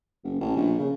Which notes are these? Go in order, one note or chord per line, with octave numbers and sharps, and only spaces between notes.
F#1
A1
A#1
C#3